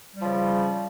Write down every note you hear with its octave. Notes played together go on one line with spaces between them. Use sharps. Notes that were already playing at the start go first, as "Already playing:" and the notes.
C#3 F3 G3